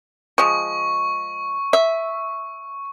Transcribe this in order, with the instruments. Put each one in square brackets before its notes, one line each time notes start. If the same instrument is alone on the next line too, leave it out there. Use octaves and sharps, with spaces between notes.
[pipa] F3 G#3 [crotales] C#6
[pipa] E5